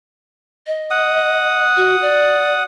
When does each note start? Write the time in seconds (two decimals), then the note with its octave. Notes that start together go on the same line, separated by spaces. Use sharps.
0.67 D#5
0.91 F#5 D#6
1.77 F#4
2.02 D5